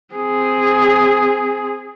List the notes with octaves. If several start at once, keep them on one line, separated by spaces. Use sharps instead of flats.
C4 G#4